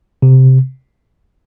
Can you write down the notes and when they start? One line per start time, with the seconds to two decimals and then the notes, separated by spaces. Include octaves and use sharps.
0.22 C3